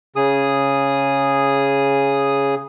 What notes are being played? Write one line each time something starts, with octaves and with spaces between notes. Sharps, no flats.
C#3 G#4 D#6